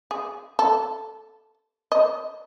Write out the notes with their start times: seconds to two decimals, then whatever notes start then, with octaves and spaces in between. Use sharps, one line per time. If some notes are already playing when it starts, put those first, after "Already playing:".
0.11 G#4
0.59 A4
1.92 D#5